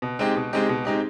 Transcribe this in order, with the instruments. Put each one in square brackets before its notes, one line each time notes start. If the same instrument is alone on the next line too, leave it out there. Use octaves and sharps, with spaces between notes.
[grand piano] B2
G#3 C4 D#4 G4
B2
G#3 C4 D#4 G4
B2
G#3 C4 D#4 G4